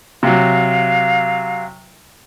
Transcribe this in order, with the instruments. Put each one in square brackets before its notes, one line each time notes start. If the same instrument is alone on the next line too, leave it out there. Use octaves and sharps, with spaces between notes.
[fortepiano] C3 F#3 [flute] F5